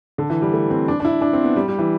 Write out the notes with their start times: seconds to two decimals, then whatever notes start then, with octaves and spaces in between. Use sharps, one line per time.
0.18 D3
0.30 E3
0.42 G3
0.53 A3
0.70 C4
0.88 D4
1.00 D4
1.05 E4
1.21 D4
1.33 C4
1.44 B3
1.56 G3
1.68 G3
1.79 E3